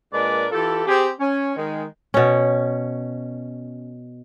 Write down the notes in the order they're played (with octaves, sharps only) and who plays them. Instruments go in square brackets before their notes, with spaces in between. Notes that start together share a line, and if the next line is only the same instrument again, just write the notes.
[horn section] A#2 G#3 D4 A#4 B4 D5
E3 F4 G4 A4
C4 G4 G#4
C#4
D#3 G#3
[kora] B2 C#4